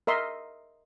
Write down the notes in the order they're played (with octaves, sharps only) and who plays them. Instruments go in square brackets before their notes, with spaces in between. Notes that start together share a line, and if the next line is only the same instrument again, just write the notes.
[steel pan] A#4 D#5 E5 C6